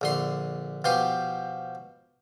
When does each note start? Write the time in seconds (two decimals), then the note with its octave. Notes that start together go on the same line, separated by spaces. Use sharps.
0.01 A#1 D3 C6
0.84 B2 F3 G4 C6